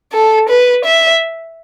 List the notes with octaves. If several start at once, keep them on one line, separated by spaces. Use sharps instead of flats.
A4
B4
E5